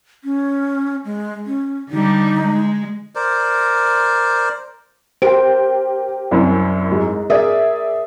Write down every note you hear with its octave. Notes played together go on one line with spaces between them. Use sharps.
C#4
G#3
C#4
D3 G3 D#4
G#3
A#4 C5 D5
G4 A#4 C5 G5 D7
C2 F#2
G#2
G#4 A#4 D5 E5 D#6